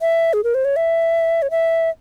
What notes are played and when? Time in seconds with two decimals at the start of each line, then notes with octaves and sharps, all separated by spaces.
0.01 E5
0.33 G#4
0.44 A#4
0.55 C5
0.65 C#5
0.76 E5
1.42 C#5
1.51 E5